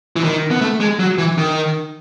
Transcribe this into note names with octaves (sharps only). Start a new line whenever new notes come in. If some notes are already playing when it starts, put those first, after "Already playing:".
E3
D#3
B3
A3
G#3
F#3
E3
D#3